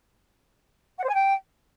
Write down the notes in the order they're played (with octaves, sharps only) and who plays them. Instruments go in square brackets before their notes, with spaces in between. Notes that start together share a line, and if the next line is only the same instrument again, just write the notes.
[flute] F#5
C5
G#5
G5